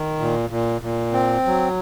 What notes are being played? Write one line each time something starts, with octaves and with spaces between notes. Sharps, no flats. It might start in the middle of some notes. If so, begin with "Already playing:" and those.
Already playing: D#3
A#2
A#2
A#2
C4
F#3